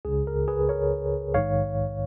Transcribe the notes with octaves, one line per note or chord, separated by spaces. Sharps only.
C#2 C#3 G#4
A#4
G#4 B4
A#4 C#5
A#1 G#2 D#3 C#5 F5